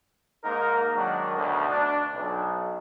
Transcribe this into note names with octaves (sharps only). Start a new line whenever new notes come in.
G#2 A#3 D#4 A#4
D#3 F#3 G#3 D4 F#4
D2 B2
D4
B1